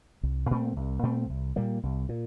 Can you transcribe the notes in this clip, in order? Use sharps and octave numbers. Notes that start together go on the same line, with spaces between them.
C2
A#2 A3 C4
C2
A#2 A3 C4
C2
A#2 G3 A#3
C2
A#2